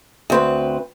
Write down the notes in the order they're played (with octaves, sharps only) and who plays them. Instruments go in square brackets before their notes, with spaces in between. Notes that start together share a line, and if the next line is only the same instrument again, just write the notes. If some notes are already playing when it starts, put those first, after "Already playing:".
[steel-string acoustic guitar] D2 C4 B4